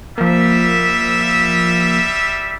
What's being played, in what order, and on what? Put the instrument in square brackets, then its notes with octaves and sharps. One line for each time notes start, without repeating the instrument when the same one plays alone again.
[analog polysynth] F3 A#3 [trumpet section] G3 E5